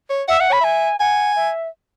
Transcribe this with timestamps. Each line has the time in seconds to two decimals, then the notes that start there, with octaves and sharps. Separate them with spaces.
0.10 C#5
0.28 E5 F#5
0.39 E5 F#5
0.50 C#5 B5
0.61 E5 G#5
1.00 F#5 G#5
1.36 E5